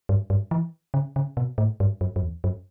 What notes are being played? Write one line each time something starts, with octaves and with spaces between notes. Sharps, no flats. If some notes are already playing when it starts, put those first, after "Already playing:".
G2
G2
E3
C#3
C#3
B2
A2
G2
F#2
F#2
E2
F#2